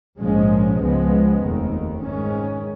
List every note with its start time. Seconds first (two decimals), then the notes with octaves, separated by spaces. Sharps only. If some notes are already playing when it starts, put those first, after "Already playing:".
0.20 A#1 G#2 F3 G#3 C#4
0.80 C#2 C#3 F3 G#3 B3
1.41 F1 D#2 D#3
2.02 G#2 D#3 G#3 C#4